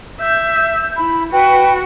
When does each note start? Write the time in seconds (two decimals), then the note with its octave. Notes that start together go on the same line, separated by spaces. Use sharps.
0.21 E5 G6
0.96 E4 B5
1.32 F#4 B4 G5